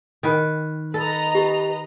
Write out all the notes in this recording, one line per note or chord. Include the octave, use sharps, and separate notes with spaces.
D#3 B4 G5
A4 B4 D#5 A#5
G4